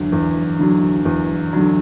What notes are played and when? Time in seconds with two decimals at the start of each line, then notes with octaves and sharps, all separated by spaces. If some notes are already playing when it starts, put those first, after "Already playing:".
Already playing: E2 D3 F#3
0.12 E2
0.59 D3 F#3
1.05 E2
1.53 D3 F#3